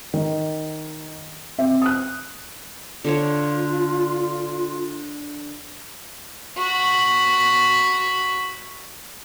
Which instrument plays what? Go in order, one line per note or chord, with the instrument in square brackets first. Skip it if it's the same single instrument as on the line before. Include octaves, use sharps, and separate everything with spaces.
[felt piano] D#3
C4 E5
D#6 F#6
[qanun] D3 A4 C#5 [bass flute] F4
[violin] F#4 B5